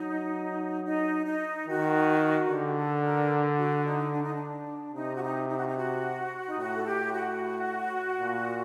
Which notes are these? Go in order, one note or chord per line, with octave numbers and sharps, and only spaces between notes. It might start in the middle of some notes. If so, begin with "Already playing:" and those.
Already playing: F#3 D#4
D#4
D#4
D#3 F#4
D3 G4
A4
A#4
F#4
D#4
D4
D#4
D4
C3 D#4
F#4
D#4
D#4
F#4
D#4
F#4
D#4
A2 F#4
A4
G4
F#4
A#2